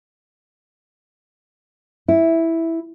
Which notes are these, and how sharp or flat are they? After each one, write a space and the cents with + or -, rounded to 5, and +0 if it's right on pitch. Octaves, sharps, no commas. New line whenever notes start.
E4 -5